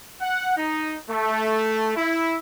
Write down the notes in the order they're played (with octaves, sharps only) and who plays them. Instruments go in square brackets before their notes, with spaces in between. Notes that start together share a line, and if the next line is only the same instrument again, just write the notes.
[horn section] F#5
D#4
A3
E4